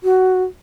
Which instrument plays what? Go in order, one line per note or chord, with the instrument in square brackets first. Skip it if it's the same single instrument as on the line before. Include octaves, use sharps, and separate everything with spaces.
[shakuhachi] F#4